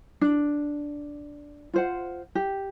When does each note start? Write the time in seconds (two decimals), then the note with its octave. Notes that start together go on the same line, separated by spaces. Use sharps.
0.21 D4
1.74 F4 C5 F#5
2.35 G4